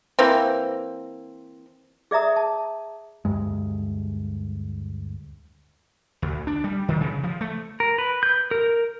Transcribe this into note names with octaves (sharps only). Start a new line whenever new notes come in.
E3 A#3 C4
G#4 D5 E5 A#5 D#6
A5
D2 G2 G#3
D2
D4
G3
D#3
C#3
F3
A3
A#4
B4
G6
A#4